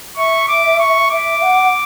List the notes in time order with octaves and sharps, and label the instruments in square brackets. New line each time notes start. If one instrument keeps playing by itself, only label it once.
[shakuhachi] E5 [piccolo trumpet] C#6
[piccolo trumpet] D6
C#6
[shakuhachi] E5 [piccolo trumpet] D6
[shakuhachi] F#5